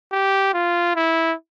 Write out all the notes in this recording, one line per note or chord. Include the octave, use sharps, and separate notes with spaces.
G4
F4
E4